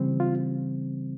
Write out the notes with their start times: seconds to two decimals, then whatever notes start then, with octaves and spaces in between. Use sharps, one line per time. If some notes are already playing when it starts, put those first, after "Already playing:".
Already playing: C#3 E3 G3 C4
0.20 F4